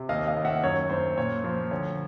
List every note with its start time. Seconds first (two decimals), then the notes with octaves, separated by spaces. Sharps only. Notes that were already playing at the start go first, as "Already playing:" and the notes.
Already playing: C3
0.09 D#2 D#5 F5
0.27 D#5 F5
0.37 D#2
0.45 E5 F#5
0.63 F#2 C#5
0.90 F#2 C5
1.17 A#2 C#5
1.44 F3 C5
1.71 D2 C#5